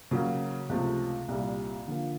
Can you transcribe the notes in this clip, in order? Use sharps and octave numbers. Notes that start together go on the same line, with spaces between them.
C#3 F#3 A#3
C#2 C3 F3 A3
C2 A#2 G3
D3 F3 A#3